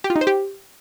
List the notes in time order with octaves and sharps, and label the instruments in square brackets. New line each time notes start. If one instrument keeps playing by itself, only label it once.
[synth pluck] G4
F4
D#4
C5
G4